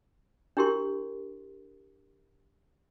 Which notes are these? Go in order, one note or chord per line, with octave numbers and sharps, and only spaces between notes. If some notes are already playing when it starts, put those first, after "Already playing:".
D4 E4 G4 A#4 C6